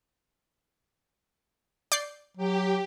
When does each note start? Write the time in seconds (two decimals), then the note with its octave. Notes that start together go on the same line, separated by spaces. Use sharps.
1.92 D5 G6 C7
2.37 F#3 G4